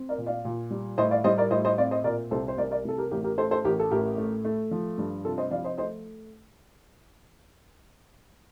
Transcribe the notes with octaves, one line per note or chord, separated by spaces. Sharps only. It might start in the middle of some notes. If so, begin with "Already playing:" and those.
Already playing: C4
A#4 D5
A#2
D5 F5
A#2
G3
A2 C5 D#5
D5 F5
G3 C5 D#5
A#4 D5
A2 C5 D#5
C5 D#5
C4 D5 F5
C5 D#5
A#2 A#4 D5
C2 A4 C5
C5
C2 A#4 D5
A#4 D5
C2 A4
G4 A#4
A1 G4 A#4
G4 A#4
A3 A4 C5
A4 C5
A1 G4 A#4
A4
A2 G4 A#4
A3
A3
F3
G2
C3 F4 A4
C5 D#5
F3 D5 F5
C5 D#5
A3 C5 D#5